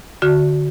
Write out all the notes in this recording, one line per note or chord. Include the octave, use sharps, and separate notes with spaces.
D3 F#4